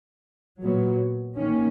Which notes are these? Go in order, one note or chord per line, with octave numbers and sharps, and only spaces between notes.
A#2 F#3 B3
D#3 A#3 C#4